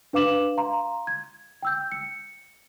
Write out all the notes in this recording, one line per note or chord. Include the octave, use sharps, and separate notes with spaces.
D4 B4 F5 D6 E7 F#7
F5 A#5 C6
G#6
G5 E6 G6
C#7